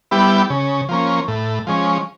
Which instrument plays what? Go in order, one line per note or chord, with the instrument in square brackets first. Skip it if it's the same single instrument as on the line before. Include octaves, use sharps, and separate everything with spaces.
[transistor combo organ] G3 B3 E4 G4
C#3
F3 A#3 C#4
A2
F3 G#3 C#4